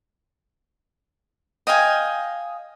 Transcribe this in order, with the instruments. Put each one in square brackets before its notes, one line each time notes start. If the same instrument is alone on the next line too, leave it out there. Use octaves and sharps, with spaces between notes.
[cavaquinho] D#5 F5 G5 G#5